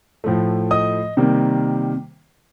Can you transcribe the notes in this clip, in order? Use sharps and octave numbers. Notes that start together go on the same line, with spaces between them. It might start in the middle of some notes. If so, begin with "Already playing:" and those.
A2 F3 A3
D#5 D#6
C3 D#3 G3 A#3